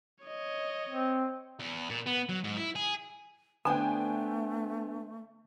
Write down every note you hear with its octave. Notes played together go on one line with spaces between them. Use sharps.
C#5 D#5
C4
E2
A#2
B3
F#3
G#2
E4
G#4
D3 A3 B3 D4 C5 G5 G#5